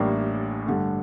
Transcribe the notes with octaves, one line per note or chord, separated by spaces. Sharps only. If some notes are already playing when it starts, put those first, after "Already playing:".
Already playing: A1 A2 G3 A#3 D4
G2 D3 A3